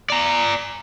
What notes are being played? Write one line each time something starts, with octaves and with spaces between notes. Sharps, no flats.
D5 A#5